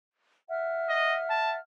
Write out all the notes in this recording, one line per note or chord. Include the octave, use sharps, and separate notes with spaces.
E5 F#5 F6
D#5
A5